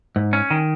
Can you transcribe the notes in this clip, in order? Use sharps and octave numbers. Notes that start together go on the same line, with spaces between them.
G#2
C#4
D#3